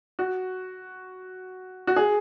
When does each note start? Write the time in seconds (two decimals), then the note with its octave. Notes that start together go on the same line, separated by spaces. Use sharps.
0.19 F#4
1.87 F#4
1.96 G#4